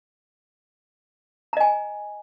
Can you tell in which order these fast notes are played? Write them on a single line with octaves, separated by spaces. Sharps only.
A#5 D#5 G#5